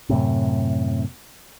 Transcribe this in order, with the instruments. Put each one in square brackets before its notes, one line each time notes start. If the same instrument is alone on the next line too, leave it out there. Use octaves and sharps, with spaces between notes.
[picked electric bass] F#2 A2 C3